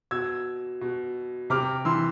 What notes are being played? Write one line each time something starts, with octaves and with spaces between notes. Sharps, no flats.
B2 E6 G#6
B2
C3 D6 F6
E3 C6 E6